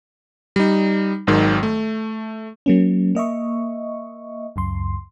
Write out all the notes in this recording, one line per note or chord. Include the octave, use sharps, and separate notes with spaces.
G3 D#4
G#1 G#2 D#3 F#3
A3
F#3 A#3 C#4
A#3 D#5 E5 C#6
C#2 F#2 C6